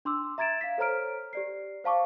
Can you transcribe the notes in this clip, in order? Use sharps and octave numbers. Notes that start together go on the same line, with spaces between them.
D4 C6 D6 E6
E5 A#5 G#6 A6 D7 E7
F5 B6
A4 C5 C#5 A#5 F6 D7
G4 D5 C7
C5 F5 A5 C#6 D6